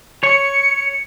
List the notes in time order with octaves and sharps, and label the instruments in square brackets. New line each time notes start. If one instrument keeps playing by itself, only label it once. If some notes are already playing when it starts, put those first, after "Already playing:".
[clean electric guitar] C#5 [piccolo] C#7